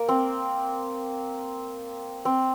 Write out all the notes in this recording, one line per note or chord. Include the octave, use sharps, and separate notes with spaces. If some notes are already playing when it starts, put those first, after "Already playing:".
Already playing: A#3
C4
C4